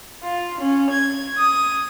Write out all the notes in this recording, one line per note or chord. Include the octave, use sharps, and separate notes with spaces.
F4
C#4
G#6
D#6